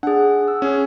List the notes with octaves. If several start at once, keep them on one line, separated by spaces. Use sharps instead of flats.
D4 G#4 F#5
E6
C#4 G#4